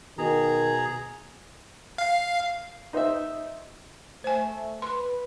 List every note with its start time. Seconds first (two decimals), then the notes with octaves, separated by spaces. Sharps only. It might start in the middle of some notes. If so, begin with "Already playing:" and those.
0.18 B2 D#3 G#4 A#5
1.98 F5
2.93 D#4 C5 D#5 E5
4.24 A3 C5 G#5
4.82 B4 C6